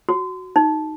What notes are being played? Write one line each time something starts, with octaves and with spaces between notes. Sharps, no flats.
F#4
D#4